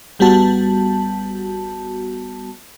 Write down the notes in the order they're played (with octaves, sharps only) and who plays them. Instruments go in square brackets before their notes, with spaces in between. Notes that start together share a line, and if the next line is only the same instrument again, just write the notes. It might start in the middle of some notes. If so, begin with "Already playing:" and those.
[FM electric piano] G#1 G3 B3 F#4 A5